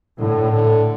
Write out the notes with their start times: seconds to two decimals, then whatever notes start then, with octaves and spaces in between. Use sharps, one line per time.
0.19 A2 D3
0.52 D3